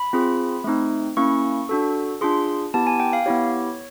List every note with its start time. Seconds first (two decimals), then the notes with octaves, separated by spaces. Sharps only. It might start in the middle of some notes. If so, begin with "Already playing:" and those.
Already playing: B5
0.13 C4 F4 G#4
0.64 A3 C4 D#4
1.17 A#3 C#4 E4 C#6
1.69 D4 F#4 A4
2.21 D4 F4 G#4 C6
2.74 B3 E4 G4 A5
2.87 G#5
3.00 G5
3.13 F5
3.26 B3 E4 G4 C#5